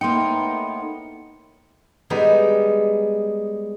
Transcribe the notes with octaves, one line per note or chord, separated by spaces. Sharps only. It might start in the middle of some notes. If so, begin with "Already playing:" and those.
A2 A#3 B3 D#4 G5 C6 C#7
G3 G#3 B3 D#4